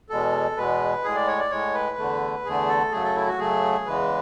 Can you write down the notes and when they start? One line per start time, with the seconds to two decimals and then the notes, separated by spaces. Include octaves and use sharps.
0.10 E2 B2 G#3 A4
0.57 E2 B2 G#3 B4
1.04 A2 G#3 G#4
1.15 D5
1.28 C#5
1.39 D5
1.51 A2 G#3 C#5
1.74 B4
1.98 E2 D3 A3
2.45 E2 D3 A3 G#4
2.68 A4
2.92 F#2 C#3 F#3 A3 G#4
3.04 A4
3.15 E4
3.27 F#4
3.39 F#2 C#3 F#3 A3 G#4
3.86 E2 C#3 E3 G#3 B4